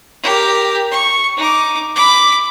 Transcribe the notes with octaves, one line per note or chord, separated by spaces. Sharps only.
G4 A#4
C#6
D#4 D6
B5 D6